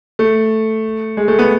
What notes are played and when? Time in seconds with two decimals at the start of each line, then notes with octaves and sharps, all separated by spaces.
0.19 A3
1.17 G#3
1.28 A3
1.39 B3